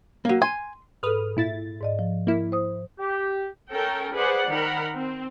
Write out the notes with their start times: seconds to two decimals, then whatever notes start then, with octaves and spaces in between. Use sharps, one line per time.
0.25 F#3 A#3
0.42 G#5 C6
1.03 G#2 A4 B4 D#6 F6
1.37 A#2 E4 A6
1.81 G#2 D5 D#5
1.99 F3
2.27 A#3 E4
2.52 C5 D#6
2.99 G4
3.71 C#4 A4 A#4 G5
4.13 G#4 B4 C5 D5 F#5
4.49 D#3 A#4 F#5 B5
4.94 C4